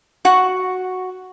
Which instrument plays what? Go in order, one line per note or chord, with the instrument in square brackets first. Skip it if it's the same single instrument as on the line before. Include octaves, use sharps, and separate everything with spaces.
[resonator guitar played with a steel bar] F#4 F#5